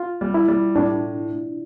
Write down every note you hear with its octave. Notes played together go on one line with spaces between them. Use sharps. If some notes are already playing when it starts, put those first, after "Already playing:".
Already playing: F4
G3
E4
G3
A2 D4